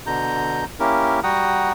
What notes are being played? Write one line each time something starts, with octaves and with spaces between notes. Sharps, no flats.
B2 D3 A#5 G6
A#3 C#4 E4 G4 A#4
G3 F#4 F#5 G5 A#5 D#6